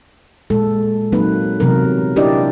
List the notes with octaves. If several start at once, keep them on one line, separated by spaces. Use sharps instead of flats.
A#2 G#3 A4
F#3 A#3 C4 D#4 B4
C3 E3 F#3 B3 A#4
D4 E4 G4 A#4 D5 D#5